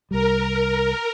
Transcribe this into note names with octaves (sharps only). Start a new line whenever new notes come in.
C2 G3 A#4